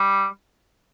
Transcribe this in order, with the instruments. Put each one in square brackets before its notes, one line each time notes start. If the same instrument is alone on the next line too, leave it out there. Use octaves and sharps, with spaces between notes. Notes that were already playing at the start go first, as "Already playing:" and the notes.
Already playing: [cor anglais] G3